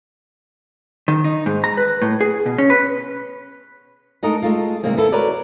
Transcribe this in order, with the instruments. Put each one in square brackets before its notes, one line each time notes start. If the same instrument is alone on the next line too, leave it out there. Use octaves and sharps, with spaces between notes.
[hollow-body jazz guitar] D#3
D#4
G#2
A#5
B4
A2
G#4
B2
C#4
B4
[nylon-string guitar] G#3 A3 D#4 A4 A#4 D#5
G#3 A3 F4
C3 D#3 G3 G#3 A#3 C4
A#3 B3 E4 A4
F#4 A#4 B4 C#5 D5